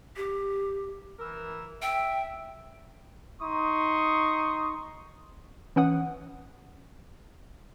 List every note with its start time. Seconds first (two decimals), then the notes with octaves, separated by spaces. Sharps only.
0.16 G4
1.20 E3 A#4 E6
1.82 E5 G5
3.42 D#4 C6 C#6 D#6
5.76 E3 C#4 F#5 D#6